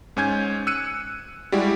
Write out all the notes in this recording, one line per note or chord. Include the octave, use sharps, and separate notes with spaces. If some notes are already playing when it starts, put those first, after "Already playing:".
G#2 C#4 G#5 G6 G#6
E6 F#6 C#7 D#7
G3 G#3 E4 F#4 G4